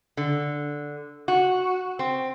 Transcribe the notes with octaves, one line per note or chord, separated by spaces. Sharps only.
D3
F#4
C4